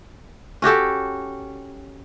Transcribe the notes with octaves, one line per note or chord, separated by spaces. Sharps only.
C#4 F#4 G4 A4